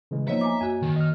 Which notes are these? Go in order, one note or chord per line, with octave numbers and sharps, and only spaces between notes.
C#3 E3 G#3
F3 A#3 B3 D#4 C#5 D#5 E5
G#5 A#5 D6
F#2 F#4 G#5
D#3
D#5 F6